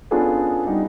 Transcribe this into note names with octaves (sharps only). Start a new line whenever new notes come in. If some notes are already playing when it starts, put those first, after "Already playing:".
B3 C#4 D4 F4 G#4 A4
G3 D#4 F#4